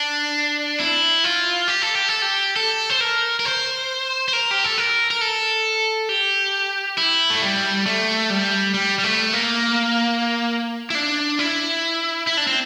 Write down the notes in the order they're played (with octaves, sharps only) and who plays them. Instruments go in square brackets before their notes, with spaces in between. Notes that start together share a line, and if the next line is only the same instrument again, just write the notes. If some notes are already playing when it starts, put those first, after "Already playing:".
Already playing: [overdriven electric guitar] D4
E4
F4
G4
A4
G4
A4
G4
A4
C5
A#4
A#4
C5
C5
A#4
G4
A4
A#4
A#4
A4
G4
E4
A3
G3
A3
G3
G3
G3
A3
A#3
E4
D4
E4
E4
D4
C4